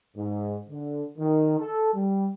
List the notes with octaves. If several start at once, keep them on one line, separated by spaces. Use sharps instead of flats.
G#2
D3
D#3
A4
G3